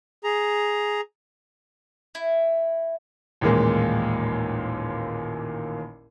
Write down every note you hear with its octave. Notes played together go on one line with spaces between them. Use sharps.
G#4 A#5
E4
A1 D#2 A#2 G#3 A#3